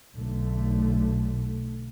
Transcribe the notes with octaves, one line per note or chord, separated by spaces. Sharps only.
B1 D3 A3